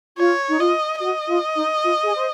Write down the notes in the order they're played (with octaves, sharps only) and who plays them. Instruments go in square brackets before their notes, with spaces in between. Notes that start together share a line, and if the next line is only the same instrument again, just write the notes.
[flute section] F4 [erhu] C#5
[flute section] D#4
[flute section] F4 [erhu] D#5
[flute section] F#4 [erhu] D#5
[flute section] F4
D#4
F4
G#4
C5